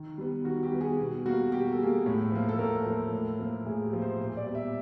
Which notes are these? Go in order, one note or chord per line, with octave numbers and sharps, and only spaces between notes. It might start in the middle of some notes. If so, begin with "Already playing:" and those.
Already playing: D#3
G3 B3
D#3 F#4
G4
G3 B3
G#4
B2
G3 A#3 F#4
B2 G4
A4
G3 A#3 G#4
A2
F3 A#3
A4
A2 A#4
F3 A#3
A2
F3 A#3
A2 G#4
G4
F3 A#3
C5
A#2
D5
G3 B3
E5